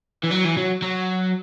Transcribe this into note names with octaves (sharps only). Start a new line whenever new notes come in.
E3
F#3
E3
F#3
F#3